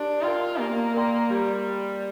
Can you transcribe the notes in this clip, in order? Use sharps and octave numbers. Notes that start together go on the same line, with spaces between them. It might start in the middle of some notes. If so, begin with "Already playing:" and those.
Already playing: D4 G4 A#4
F4 A#4 D5 G5 C6
A#3 G4
A#4 D5 G5 C6
G3 G4